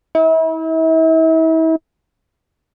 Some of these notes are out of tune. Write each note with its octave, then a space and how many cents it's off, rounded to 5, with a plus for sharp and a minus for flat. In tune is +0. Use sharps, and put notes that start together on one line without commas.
E4 -40